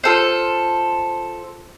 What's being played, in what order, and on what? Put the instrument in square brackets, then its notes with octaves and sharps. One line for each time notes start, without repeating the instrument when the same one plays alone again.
[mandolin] F4 A4 C5